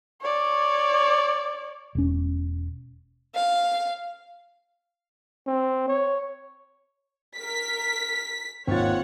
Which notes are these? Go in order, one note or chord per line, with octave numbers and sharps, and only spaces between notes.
C#5 D5
E1 C#4
F5
C4
C#5
A#4 B6
G#1 D#2 C4 F4 C#5 F#5 A6